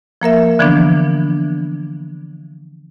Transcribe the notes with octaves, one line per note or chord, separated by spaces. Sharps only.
F3 A#3 A#4 E5
D3 E3 F3 B3 D4